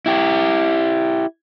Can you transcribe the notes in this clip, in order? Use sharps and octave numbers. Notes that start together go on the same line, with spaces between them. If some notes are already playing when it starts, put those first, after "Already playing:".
E4 G4